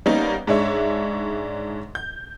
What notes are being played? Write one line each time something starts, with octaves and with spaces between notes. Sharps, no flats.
G3 A#3 B3 C#4 D#4
G#2 G#3 D4 C#5 E5
G6